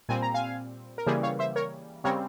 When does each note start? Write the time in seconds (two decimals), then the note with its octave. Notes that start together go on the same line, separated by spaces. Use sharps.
0.09 A#2 G3 C4 G#5
0.22 A#5
0.34 F5 G#5
0.98 A#4
1.07 C#3 E3 G3 A#3 G#4 C5
1.23 C#5 F5
1.39 C5 E5
1.56 A#4 C#5
2.04 C#3 G3 C4 A#4 C#5